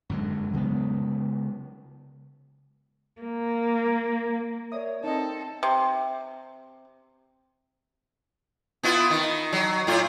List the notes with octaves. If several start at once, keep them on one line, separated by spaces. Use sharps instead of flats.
F#2 D3 G#3
C#3 F#3 G#3 B3
A#3
A#4 C#5 D5 E5 D#6
C4 D#4 A4 D#5
C3
B3 E4 F4
D#3
F#3
A2 F4